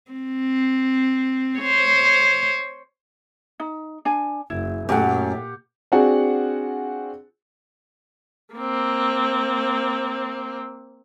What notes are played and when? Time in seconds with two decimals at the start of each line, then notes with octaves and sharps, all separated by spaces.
0.12 C4
1.60 C5 C#5
3.60 D#4
4.05 D4 G#5
4.50 F#1 E4
4.89 F#2 A#2 A3 G4 F5 F#5
5.92 C4 D4 F4 F#4 G#4 F#5
8.54 A#3 C4